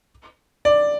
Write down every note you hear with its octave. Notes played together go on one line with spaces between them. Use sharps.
D5